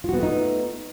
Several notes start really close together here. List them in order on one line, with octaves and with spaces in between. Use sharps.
F4 F#4 B3 A3 D#4